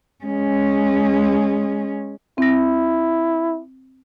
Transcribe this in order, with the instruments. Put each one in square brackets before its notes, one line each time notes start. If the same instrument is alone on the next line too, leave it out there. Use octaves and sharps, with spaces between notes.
[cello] G#3 C#4
[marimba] C4 A#6 [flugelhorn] E4